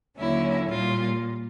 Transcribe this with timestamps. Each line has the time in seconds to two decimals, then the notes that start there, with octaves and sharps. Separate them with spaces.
0.18 D#2 D3 F#3 A#3 C#4 E4
0.69 A#2 G3 A#3 F4